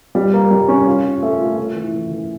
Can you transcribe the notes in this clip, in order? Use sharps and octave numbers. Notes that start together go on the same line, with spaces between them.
G3
A#3
G3
C#4
F4
F4
A3
F4
A3
E3
E3
E3